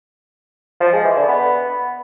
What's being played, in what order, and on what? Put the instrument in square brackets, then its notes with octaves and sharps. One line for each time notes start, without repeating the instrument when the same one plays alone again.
[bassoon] F3
G#3
E3
D3
B3